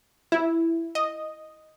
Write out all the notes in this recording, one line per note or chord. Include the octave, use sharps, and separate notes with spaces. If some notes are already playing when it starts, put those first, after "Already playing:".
E4
D#5